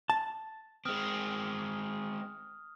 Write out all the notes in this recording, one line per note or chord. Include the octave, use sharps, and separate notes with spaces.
A5
G#3 C4 D#6 F6